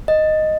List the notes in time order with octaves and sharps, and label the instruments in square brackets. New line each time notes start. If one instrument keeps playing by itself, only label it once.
[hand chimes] D#5